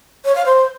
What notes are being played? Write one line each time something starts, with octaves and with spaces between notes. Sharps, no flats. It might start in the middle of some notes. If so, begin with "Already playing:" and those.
C#5
F5
C5